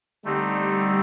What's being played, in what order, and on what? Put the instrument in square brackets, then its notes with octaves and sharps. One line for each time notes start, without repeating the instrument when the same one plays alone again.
[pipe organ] D3 A3 C4 D#4 [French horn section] G3